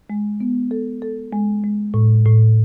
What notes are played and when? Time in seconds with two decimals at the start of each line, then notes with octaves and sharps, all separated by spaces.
0.10 G#3
0.40 B3
0.71 A4
1.02 A4
1.33 G#3
1.64 G#3
1.94 A2
2.25 A2